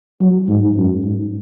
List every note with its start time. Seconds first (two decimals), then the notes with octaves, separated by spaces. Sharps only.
0.21 F#3
0.49 G#2
0.77 F#2
1.05 G#2